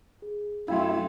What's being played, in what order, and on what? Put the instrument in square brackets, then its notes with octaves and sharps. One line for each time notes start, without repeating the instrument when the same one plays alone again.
[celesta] G#4
[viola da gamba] F#2 A3 [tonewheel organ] E4 [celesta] F5 G5 C6